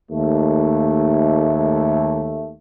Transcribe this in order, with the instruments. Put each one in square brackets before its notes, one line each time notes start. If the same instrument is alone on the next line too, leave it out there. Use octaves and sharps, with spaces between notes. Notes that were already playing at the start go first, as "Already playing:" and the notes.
[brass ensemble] D#2 A3